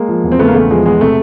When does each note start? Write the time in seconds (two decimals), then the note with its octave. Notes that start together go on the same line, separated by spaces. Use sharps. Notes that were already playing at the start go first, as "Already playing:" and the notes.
Already playing: G#3 A#3
0.08 F3
0.24 E2
0.32 C4
0.39 C#3 A3 B3
0.48 A#3
0.55 E2 A3
0.70 F3 G#3
0.86 E2 G#3
1.01 C3 A3